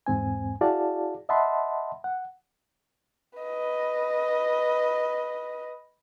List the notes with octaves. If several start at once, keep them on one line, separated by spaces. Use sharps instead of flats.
E2 G#2 C4 G#5
E4 F#4 G#4 D5 F5 A5
D#5 E5 F#5 A5 B5 C6
F#5
B4 D#5